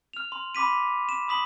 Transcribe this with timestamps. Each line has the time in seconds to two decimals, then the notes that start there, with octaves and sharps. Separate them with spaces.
0.13 F6 F7
0.32 C6
0.55 B5 C6 D6 B6 D#7
1.09 E7
1.28 B5 D#6 B6 F#7